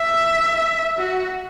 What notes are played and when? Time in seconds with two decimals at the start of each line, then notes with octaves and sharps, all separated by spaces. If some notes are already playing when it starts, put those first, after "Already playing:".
Already playing: E5
0.99 F#4